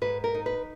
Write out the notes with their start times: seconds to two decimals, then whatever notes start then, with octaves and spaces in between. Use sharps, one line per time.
0.01 G#2 B4
0.24 A#4
0.34 D#4
0.46 B4